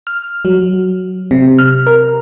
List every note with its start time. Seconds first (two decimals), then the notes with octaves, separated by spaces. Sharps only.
0.07 F6
0.45 F#3
1.31 C3
1.59 F6
1.87 A#4